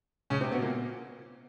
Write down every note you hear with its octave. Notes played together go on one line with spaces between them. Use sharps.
C#3 C#4
C3 C4
B2 B3
A#2 A#3